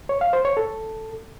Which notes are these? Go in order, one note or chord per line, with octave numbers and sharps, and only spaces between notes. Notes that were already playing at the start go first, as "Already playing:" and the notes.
C#5
F5
C5
C#5
A4